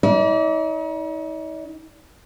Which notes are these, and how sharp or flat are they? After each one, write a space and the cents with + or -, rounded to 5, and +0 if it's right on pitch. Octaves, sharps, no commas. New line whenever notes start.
D#4 +40 D5 -30